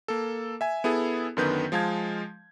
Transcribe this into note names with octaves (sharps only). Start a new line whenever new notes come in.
A#3 A4
E5 G#5
B3 E4 G#4 A4
F#2 D3 D#3 B3 B4 G6
F3 G#3 F5 A5 G#6